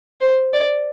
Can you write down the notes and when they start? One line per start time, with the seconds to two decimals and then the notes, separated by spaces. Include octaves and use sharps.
0.21 C5
0.53 D5